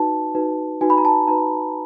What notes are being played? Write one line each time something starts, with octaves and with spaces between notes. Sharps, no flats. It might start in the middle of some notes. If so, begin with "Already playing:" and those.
Already playing: D#4 F#4 B4 A5
D#4 F#4 B4
D#4 F#4 B4 G#5
B5
A#5
A5
D#4 F#4 B4 A#5